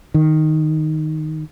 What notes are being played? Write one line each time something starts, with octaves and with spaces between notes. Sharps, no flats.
D#3